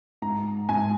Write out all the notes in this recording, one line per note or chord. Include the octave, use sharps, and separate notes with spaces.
G#2 A#5
G#2 G#5